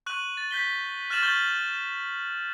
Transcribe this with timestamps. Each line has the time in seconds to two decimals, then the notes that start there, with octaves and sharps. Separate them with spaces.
0.06 C#6 F#6 D#7 F#7
0.37 A6
0.51 G6 B6 G7
1.10 F6 F#6 A6 E7 F#7
1.22 C#6 F6 G6 A6 G7